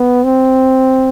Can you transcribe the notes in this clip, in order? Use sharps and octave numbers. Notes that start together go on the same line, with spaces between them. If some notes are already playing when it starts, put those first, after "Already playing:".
Already playing: B3
C4